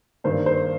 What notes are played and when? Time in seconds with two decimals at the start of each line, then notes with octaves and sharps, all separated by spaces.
0.24 G2 D#3 A#3 C5
0.46 C5